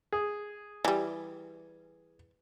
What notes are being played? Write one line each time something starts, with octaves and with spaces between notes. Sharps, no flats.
G#4
E3 G3